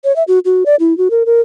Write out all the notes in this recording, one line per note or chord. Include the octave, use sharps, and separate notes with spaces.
C#5
E5
F#4
F#4
D5
E4
F#4
A#4
A#4